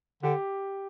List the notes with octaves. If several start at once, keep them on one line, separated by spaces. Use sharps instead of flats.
D3 G4